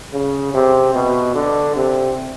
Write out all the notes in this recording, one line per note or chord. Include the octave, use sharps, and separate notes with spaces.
C#3
C3
B2
D3
C3